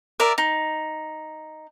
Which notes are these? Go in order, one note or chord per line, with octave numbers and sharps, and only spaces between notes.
A#4 D5 E5
D#4